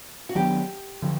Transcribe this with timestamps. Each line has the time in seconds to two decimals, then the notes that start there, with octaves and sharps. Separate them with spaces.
0.29 F#4
0.35 D#3 F#3 B3 D4 G4
1.02 D3 F3